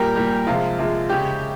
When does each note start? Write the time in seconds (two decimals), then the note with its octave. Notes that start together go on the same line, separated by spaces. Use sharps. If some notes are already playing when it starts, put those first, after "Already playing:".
Already playing: A#2 G3 G4 A#4
0.16 A#2 G3
0.47 C3 F3 G#3 F4
0.78 C3 F3 G#3
1.09 C#3 G#3 G4